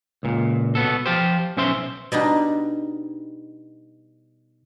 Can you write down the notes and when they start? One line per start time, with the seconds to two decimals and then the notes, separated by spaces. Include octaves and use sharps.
0.23 C#2 A#2
0.75 B2 B3 A4
1.06 F3 F4 G4 C5
1.57 B1 C#4 C5 E5 C6
2.12 B2 G3 D4 D#4